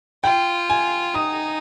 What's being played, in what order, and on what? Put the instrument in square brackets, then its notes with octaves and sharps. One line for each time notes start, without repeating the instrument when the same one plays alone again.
[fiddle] F4 [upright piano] G5
[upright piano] G#5
[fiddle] D#4 [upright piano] D#6